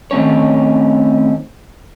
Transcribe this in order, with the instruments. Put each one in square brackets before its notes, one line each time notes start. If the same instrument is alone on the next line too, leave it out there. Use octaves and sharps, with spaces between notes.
[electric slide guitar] D#3 A3 C4 C#4 C#5